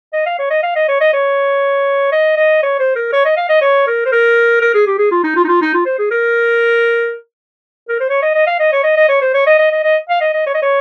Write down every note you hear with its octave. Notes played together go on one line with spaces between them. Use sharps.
D#5
F5
C#5
D#5
F5
D#5
C#5
D#5
C#5
D#5
D#5
C#5
C5
A#4
C#5
D#5
F5
D#5
C#5
A#4
C5
A#4
A#4
G#4
G4
G#4
F4
D#4
F4
D#4
F4
D#4
F4
C5
G#4
A#4
A#4
C5
C#5
D#5
D#5
F5
D#5
C#5
D#5
D#5
C#5
C5
C#5
D#5
D#5
D#5
D#5
F5
D#5
D#5
C#5
D#5
C#5